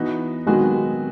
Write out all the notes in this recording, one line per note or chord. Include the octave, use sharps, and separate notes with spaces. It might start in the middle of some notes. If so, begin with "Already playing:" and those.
Already playing: E3 B3 D#4 F#4
D#3 F#3 G#3 B3 F#4 G#4